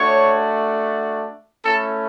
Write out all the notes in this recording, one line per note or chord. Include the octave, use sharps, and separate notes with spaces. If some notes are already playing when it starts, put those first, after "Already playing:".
Already playing: A3 D4 F#4 C#5
A3 C#4 E4 A4